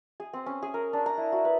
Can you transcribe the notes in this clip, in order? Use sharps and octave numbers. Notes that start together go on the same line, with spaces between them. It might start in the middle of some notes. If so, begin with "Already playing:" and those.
G#4
C4
C#4
G#4
A#4
D4
A#5
E4
F#4
B4